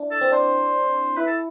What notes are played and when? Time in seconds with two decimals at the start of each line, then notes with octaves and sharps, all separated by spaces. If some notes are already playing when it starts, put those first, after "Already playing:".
Already playing: D4 E4
0.11 A4
0.21 C4
0.32 D4 C5
1.17 E4 B4
1.27 A4